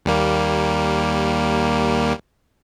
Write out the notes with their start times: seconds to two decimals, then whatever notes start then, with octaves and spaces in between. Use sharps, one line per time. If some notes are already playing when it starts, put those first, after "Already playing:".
0.05 D#2 G3 A#3